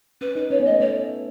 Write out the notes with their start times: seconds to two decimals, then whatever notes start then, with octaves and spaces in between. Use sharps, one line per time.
0.21 C#4 B4
0.35 D#4 B4
0.50 C#4 C#5
0.60 B3
0.65 A3 D#5
0.80 A3 C#5